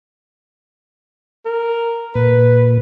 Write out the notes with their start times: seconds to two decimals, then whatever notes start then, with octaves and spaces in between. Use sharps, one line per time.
1.45 A#4
2.15 A#2 B4